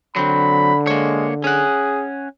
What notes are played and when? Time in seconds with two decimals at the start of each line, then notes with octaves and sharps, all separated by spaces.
0.16 D3 F#3 C4 B5
0.87 G#3 A#3 C#5
1.44 C#4 G#4 F#5